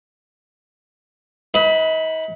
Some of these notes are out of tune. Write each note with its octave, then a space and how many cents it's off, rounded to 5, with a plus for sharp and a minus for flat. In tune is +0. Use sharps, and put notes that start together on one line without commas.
D#4 +40 B4 +0